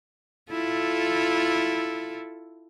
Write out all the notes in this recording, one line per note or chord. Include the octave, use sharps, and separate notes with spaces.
E4 F4 A4